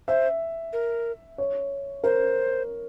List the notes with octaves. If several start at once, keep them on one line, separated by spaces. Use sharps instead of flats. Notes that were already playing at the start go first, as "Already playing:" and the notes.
C5 E5
A#4
C#5
A#4 C5